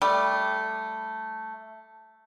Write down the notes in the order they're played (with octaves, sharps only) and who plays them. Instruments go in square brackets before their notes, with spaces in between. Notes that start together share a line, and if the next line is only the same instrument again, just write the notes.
[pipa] G3 A3